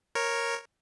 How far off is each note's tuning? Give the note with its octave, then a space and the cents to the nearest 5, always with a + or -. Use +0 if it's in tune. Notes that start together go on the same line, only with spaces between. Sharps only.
A#4 +0 C#5 -10